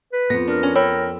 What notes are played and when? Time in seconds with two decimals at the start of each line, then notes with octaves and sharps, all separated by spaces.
0.13 B4
0.30 F2 B3 A#6
0.48 D4 A#4
0.63 C#4
0.75 A#4 C#5 G5 B5 E6